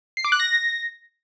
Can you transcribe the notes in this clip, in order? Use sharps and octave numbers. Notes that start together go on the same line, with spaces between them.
C7
D6
F#6
A#6